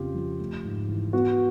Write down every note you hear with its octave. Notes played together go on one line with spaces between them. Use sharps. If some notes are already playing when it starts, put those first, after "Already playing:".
Already playing: F2 C#3 F4 G4
F3
A3
G#2
E3
B3 F#4